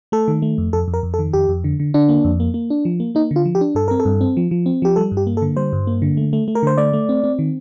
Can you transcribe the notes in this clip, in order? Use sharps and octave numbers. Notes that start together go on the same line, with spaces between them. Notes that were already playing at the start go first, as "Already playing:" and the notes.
A3 A4
D#3
A3
F2
F2 A4
F2
A#4
F2
A4
D#3
F2 G4
F2
D3
D3
D3 D4
A#3
F2
A#3
A#3
D4
F3
A#3
A#3 D#4
D3
F4
F3
G4
D4
G2 A4
C4 A#4
A4
G2
C4
F3
F3
C4
F3 G4
G3 A4
G2
G4
A#3
A4
D3
G3 C5
G2
A#3
D3
A3
A3
A3
A#4
D3 C5
A3 D5
A3
C4
C4
D#3